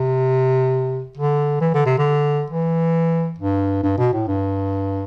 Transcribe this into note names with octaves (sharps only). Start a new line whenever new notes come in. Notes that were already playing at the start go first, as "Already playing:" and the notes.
Already playing: C3
D3
E3
D3
C3
D3
E3
G2
G2
B2
A2
G2